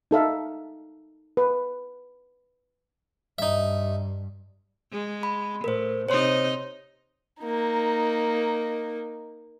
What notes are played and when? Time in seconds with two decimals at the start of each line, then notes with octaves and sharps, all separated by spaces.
0.11 D#4 A4 E5 F5
1.37 B4
3.39 G2 D#4 E5
4.92 G#3
5.23 B5
5.64 A2 A#4 C5
6.09 C3 D#4 C5 C#5 D#5 C6
7.42 A#3 D#4